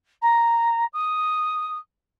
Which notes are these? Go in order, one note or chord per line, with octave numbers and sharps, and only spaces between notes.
A#5
D#6